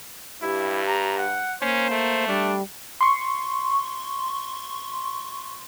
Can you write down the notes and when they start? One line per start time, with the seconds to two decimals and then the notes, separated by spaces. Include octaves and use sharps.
0.42 G2 E4 G4
0.87 A#5
1.17 F#5
1.62 A#3 C#4 C5
1.91 A3
2.28 G3 D4
3.01 C6 C#6